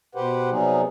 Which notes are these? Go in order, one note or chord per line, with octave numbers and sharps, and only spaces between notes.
B2 G4 B4 C5 F#5
C3 F#3 G3 B3 D#4 G#4